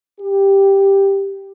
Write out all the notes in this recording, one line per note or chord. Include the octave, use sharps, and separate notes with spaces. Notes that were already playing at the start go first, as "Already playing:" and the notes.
G4